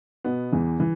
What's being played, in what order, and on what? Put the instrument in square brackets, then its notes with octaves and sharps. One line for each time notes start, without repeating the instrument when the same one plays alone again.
[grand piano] B2 B3
E2 E3
E3